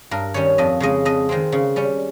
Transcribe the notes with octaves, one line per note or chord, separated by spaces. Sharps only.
G2 A#4
D#3 G3 C#4 C#5
F2 D#5
C#3 G#3 D#5
F2 D#5
D#3 G#3 C4
C#3
G3 C#4